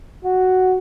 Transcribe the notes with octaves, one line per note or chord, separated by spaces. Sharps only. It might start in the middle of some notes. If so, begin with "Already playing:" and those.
F#4